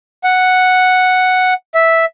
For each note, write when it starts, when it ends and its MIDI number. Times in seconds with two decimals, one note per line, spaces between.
0.24 1.54 78
1.75 2.05 76